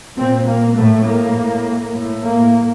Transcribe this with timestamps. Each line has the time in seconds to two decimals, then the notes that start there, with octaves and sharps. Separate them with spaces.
0.18 A#2 C4
0.47 A#3
0.77 A2 A3
1.06 A#3
1.35 A2
1.94 A2
2.24 A#3